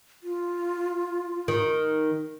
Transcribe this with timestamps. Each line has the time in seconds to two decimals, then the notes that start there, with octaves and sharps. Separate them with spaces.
0.23 F4
1.48 D#3